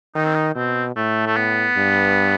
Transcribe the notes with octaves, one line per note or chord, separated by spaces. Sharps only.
D#3 D#4
C4
D#4
B2 C4
A2 A3
A3
B3
G2